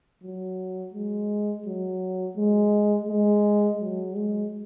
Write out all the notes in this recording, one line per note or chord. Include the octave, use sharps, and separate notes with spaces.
F#3
G#3
F#3
G#3
G#3
F#3
G#3